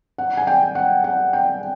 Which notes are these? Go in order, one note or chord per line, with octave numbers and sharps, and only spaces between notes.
F#5
G#5
G5
F#5
F#5
G5